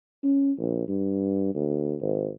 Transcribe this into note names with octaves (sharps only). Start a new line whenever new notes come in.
C#4
A#1
G2
D2
G#1